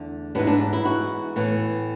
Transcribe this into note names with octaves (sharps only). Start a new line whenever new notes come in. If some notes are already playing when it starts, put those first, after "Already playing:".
Already playing: E2 D3 A3
G#2 E3 B3 D4
D4
E4
F#4
A2 E3 B3